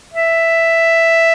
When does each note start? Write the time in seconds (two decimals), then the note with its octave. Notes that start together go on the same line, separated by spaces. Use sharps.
0.14 E5